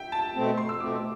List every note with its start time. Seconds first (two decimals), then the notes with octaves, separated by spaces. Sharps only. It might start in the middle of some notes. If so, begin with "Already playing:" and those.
Already playing: E5 G5
0.12 A5
0.35 B2 A3 C4
0.58 C6
0.69 E6
0.80 B2 A3 C4 D6